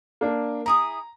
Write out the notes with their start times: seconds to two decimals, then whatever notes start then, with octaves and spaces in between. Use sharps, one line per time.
0.21 A#3 D4
0.66 E4 G#4 A#5 D#6